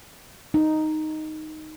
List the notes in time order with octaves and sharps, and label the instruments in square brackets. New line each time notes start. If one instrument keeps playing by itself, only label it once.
[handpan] D#4